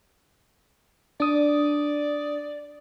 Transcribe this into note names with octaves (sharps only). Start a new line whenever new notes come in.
D4 D5 D#6